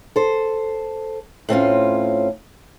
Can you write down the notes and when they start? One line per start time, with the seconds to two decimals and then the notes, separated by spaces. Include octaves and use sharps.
0.16 A4 C5
1.49 A2 C4 C#4 F4